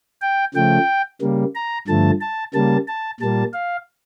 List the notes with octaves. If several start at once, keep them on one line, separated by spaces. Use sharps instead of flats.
G5
C#3 F3 A3 G5
C#3 G3 A#3
A#5
G2 D3 F3 A3 A5
A5
C#3 G3 A#3 A5
A5
A#2 G3 A#3 A5
F5